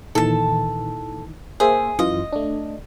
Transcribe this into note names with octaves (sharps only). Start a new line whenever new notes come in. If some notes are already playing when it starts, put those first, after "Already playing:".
A#2 D#3 E3 A4 A5
A#3 G#4 C5 E5
F#2 E3 F4 D#5
A3 D4